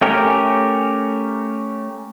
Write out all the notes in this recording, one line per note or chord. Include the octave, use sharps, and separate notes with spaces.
A3 C#4 G4 A#4